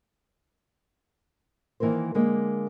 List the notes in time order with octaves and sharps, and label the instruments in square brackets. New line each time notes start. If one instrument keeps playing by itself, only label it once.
[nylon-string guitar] D#3 E3 A#3 A#4 C5
D3 G#3 A#3